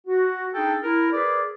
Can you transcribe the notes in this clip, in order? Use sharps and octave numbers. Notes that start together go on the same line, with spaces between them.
F#4
D4 D#4 G#4 A4 G5
E4 A#4
G#4 A#4 B4 D5